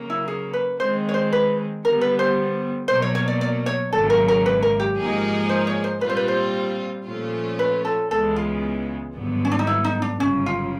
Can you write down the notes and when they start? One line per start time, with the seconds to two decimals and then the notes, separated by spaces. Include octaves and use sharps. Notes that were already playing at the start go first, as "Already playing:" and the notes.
Already playing: C#3 F#3 A#3
0.10 E4
0.28 G#4
0.53 B4
0.80 D#3 G#3 C4 C5
1.09 C#5
1.14 C5
1.33 B4
1.84 D3 G3 B3 A#4
2.01 B4
2.19 C5
2.88 B2 F#3 A#3 C5
3.02 C#5
3.15 C#5
3.28 D5
3.41 D5
3.66 C#5
3.93 G#1 F#2 C#3 F#3 A#3 A4
4.10 A#4
4.28 A#4
4.46 B4
4.62 A#4
4.80 G4
4.98 G#2 F3 A#3 D#4 G#4
5.49 C5
5.67 C#5
5.84 C5
6.01 A#2 G3 C4 F4 B4
6.10 C5
6.17 B4
6.28 C5
7.06 A#2 F3 A3 C#4 F4
7.59 B4
7.85 A4
8.10 C#2 C#3 E3 G#3 B3 A4
8.36 F4
9.15 G#1 G2 D3 F#3 B3
9.45 C#4
9.52 D4
9.59 D#4
9.67 E4
9.84 D#4
10.02 D4
10.19 G1 F#2 C#3 C#4
10.46 F4